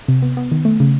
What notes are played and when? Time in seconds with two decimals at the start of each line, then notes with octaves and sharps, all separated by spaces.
0.08 C3
0.22 B3
0.37 B3
0.52 D#3
0.65 A3
0.80 C#3